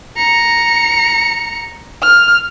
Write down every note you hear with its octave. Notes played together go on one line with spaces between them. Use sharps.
A#5 C#7
F6